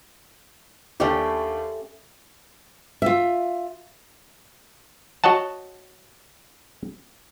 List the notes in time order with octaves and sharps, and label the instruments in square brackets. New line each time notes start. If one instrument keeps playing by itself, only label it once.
[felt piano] D#2 D4 G5 [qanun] A3 C#4 G4
[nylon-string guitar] F4 E5
[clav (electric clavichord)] F#4 C#5 D#5 F#5 A5